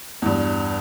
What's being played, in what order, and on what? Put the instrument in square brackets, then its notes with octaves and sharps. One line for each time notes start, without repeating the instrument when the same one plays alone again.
[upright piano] E2 G2